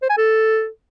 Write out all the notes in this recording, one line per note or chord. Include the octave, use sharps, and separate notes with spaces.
C5
G#5
A4